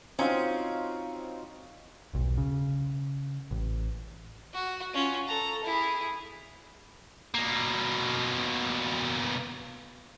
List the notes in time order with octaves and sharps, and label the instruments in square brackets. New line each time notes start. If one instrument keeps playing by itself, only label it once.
[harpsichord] C4 [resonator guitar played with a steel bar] C#4 [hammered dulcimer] D#4 F5 [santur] F4 F#4 C5
[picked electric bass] D#1 B1
C#3
A1
[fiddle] F#4
C#4 F4
A4 A#5
E4 G#4
[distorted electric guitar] B2 A#3